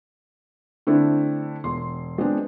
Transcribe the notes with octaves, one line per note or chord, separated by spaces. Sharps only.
D3 A3 C4 D4 E4
E1 C6
G#3 B3 C4 D4